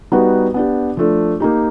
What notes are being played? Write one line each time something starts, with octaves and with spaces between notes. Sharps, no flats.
G3 B3 D#4 F#4 B4
B3 D4 G4
F3 A3 D4
A#3 D#4 G4